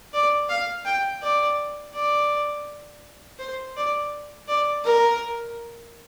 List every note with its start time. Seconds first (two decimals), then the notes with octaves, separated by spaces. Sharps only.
0.14 D5
0.49 F5
0.85 G5
1.23 D5
1.94 D5
3.39 C5
3.77 D5
4.48 D5
4.85 A#4